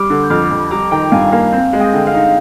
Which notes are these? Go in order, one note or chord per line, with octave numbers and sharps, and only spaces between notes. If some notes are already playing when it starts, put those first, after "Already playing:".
Already playing: G3 D6 F6
D3
G6
F2 D6 F6
F2
G3 A#5 D6
D#3 G5 A#5
G2 F5 G#5
A#3 F5
C4
G#3
D#5 G5
D3
F5
D#4